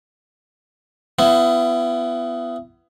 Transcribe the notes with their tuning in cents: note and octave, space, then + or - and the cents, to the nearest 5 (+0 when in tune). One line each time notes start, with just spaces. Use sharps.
B3 +20 E4 +35